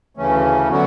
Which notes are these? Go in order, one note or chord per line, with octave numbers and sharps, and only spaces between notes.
D2 C#3 E3 A3 C#4
D3 F#3 B3 F#4